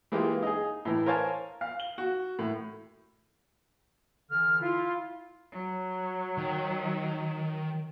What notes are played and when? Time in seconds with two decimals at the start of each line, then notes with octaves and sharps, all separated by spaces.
0.12 E3 G#3 A#3 F4 G4
0.43 D#4 G#4
0.85 A2 E3
1.06 A#4 C5 C#5 F5 G#5 A5
1.61 F5
1.80 G7
1.98 F#4
2.39 A2
4.31 D3 E3 F6
4.62 E4 F4
5.52 F#3
6.38 D#3